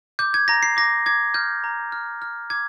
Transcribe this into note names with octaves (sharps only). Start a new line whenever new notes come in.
D6 G6
G#6
A#5 A#6
C7
D6 A#6
D6 G#6
F6 G6
A#5
F6
F6
D6 G#6